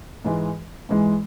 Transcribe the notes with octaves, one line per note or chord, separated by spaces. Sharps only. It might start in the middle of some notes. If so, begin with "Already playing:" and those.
G#2 E3 G#3
G#2 E3 G#3